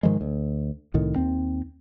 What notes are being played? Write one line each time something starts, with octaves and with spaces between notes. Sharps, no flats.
G#2 D#3 F3 G#3
D2
C2 A2 D#3
D#2 C4